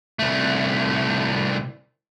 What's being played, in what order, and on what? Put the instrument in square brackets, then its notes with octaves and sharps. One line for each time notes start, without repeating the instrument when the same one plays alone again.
[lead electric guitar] C2 A3